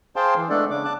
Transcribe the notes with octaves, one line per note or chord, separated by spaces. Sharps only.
G#4 C5 F5 G5 A5 C6
E3
G#3 A3 B3 D4 A4 D5
C#3 D4 D6
A5 D6 F#6